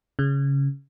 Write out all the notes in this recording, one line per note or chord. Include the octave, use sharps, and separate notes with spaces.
C#3